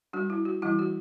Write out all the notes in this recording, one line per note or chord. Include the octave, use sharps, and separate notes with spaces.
G3 D4 F#4
E4
F#4
E3 G3 D4 E4
F#4